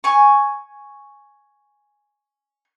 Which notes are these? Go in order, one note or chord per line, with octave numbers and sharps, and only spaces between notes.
G#5 C#6